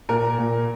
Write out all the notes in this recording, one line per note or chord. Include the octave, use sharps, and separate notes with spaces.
A#2 A#4
A#2